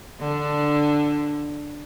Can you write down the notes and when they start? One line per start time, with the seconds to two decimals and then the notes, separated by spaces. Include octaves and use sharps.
0.21 D3 D4